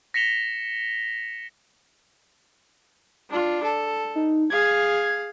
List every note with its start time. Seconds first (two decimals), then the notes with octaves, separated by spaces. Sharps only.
0.14 A#6 B6 C#7 E7 F7 G7
3.30 D4 F4
3.64 A4
4.15 D#4
4.50 G#4 F5 G#6